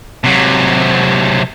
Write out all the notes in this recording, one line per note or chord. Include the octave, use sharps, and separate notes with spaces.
C3 F#3